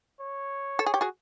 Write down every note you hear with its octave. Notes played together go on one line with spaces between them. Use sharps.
C#5
A4
G#4
G4
F#4 G#4